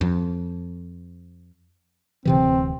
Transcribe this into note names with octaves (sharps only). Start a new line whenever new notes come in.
F2
D1 C3 E3 C4